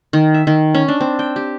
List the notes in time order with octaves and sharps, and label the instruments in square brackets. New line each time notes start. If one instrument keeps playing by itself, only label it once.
[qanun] D#3
E5
D#3
C#4
D4
C4
G5
G4